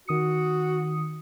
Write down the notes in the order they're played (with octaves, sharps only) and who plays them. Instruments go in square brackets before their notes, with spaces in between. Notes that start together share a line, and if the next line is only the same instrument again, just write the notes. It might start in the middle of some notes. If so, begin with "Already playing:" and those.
[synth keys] D#3 D#6 C#7 [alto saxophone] F#4